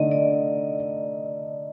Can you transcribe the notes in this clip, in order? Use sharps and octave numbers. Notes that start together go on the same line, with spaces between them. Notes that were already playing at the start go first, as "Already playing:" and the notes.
Already playing: D3 A3 D#4 D5 D#5
D5